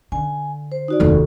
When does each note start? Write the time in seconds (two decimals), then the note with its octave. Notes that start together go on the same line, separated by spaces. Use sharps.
0.12 D3 G#5
0.72 C5
0.88 D#4 F#4 D5
1.00 F1 D#2 A4